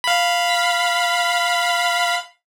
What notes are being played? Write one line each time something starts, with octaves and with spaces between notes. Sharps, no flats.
F5 B5